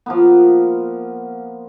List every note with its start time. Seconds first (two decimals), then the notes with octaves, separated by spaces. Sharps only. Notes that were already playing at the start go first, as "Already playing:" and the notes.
0.06 F3 A#3 B3